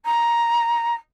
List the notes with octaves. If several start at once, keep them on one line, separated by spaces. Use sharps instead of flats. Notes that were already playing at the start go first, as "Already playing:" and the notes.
A#5